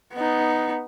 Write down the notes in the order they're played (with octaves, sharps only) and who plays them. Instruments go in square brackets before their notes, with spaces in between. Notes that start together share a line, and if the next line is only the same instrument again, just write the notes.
[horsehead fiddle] B3 D#4